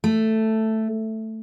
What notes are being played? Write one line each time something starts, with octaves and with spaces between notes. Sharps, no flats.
A3